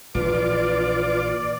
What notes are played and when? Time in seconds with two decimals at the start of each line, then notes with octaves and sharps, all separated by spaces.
0.15 A#1 E3 F4 B4 D5 D6